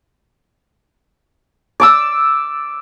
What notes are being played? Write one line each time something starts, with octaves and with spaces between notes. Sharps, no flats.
D5 D6 E6